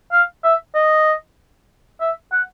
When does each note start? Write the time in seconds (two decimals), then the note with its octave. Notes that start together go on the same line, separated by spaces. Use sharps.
0.12 F5
0.44 E5
0.75 D#5
2.01 E5
2.32 F#5